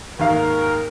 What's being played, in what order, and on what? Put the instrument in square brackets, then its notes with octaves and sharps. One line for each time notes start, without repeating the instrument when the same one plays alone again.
[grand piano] D#2 G#2 F5 [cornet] A#4